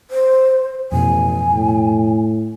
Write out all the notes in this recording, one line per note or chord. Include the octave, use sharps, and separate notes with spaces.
C5
A1 F2 B2 G#5
A2